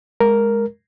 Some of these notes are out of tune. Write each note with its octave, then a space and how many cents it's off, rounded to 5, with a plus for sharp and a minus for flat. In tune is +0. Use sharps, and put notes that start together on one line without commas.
G#3 +0 A#4 +0